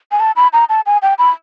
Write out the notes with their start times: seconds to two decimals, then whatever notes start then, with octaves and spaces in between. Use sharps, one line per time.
0.12 G#5
0.20 A5
0.36 B5
0.53 A#5
0.69 A5
0.86 G#5
1.02 G5
1.18 B5